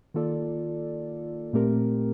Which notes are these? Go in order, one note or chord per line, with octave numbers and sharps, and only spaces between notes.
D#3 A#3 F4 A4 D5
A#2 A3 C4 G4 A#4